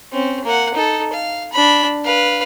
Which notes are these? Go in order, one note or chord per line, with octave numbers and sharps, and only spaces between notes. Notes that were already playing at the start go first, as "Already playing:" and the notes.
C4 C#4
A#3 F#5
D#4 A4
F5
D4 B5
B4 F5